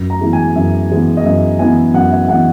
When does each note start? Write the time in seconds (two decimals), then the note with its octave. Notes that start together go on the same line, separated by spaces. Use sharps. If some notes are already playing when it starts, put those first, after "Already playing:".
Already playing: F#2
0.10 A#5
0.21 E3 G#3 B3 E4
0.33 G#5
0.56 F#2 E5
0.91 E3 G#3 B3 E4
1.17 D#5
1.25 F#2 E5
1.59 E3 G#3 B3 E4 G#5
1.94 F#2 F#5
2.11 E5
2.28 E3 G#3 B3 E4 F#5